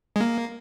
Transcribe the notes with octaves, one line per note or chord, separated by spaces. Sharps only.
G#3
A#3